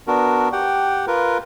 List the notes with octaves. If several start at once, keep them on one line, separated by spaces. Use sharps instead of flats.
B3 D4 F#4 A#4
G4 F#5 G5
F4 A#4 B4